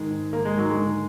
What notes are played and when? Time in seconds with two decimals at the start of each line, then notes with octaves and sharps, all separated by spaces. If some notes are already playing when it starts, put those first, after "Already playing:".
Already playing: G#2 D#3 G#3
0.11 G#2
0.33 D#3 A#3
0.45 G#3
0.55 G#2 F#3
0.70 G#3
0.76 D3